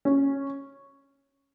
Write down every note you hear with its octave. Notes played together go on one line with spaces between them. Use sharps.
C#4